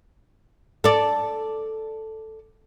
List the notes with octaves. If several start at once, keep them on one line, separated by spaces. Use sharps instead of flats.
A4 D5